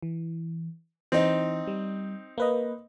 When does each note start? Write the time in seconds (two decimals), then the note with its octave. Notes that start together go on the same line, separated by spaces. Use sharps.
0.03 E3
1.12 E3 C4 D#4
1.67 G3
2.38 A#3 B4 D#5